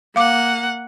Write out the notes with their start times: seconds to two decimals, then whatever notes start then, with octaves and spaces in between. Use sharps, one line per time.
0.16 A#3 F5 F#5 D6